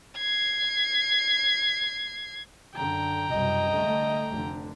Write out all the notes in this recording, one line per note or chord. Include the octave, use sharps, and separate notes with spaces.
G#6 C7
F#2 D3 G5 A#5
C2 F#2 B2 D#5
D3 A3
F1 D3